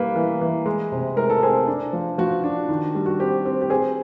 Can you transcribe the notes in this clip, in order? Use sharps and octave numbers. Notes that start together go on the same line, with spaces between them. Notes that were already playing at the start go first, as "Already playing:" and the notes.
Already playing: G3 A#3 B4
E3
E3
G#3
C3
G#3 A#4
A4
C4 G#4
D4
F3
F3 F#4
D4
D#3
G3
F#4
C4 G4
C4
G4
C4 G#4